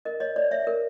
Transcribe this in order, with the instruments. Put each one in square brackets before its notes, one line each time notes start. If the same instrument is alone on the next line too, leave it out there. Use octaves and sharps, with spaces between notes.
[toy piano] A#4 D#5
C#5 D#5
C#5 D5
C#5 E5
A#4